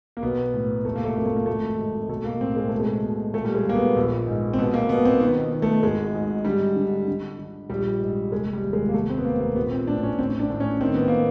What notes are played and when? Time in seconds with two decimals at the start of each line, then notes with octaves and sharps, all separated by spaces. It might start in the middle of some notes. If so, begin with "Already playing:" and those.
0.17 A#3
0.23 B1 B3
0.54 A2
0.85 F1 A3
0.95 A#3
1.05 A3
1.16 F2 A#3
1.26 A3
1.36 A#3
1.46 G#1 A3
1.78 G#2
2.09 B1 A3
2.25 A#3
2.40 A2 C4
2.56 G#3
2.68 B2 A3
2.80 G#3
3.02 B2
3.33 A#2 A3
3.45 G3
3.55 G#3
3.65 A#2 A#3
3.75 B3
3.96 A#1
4.27 G#2
4.53 C4
4.58 B2 B3
4.74 A#3
4.89 B2 B3
5.05 C4
5.20 D#3 B3
5.51 D#3
5.62 A3
5.83 G#1 G#3
6.14 G#2
6.44 D3 G3
6.76 D3
7.07 D3
7.38 D3
7.70 A#1 G3
8.01 G#2
8.32 F1 G#3
8.53 G3
8.63 D#2
8.73 G#3
8.89 A#3
8.94 F1 A3
9.10 C4
9.18 B3
9.25 D#2 A#3
9.41 A#3
9.56 A#1 B3
9.72 C4
9.87 A2 D4
10.03 C#4
10.19 A1 C4
10.39 D4
10.50 A2
10.60 C#4
10.81 D#3 C4
10.95 B3
11.08 A#3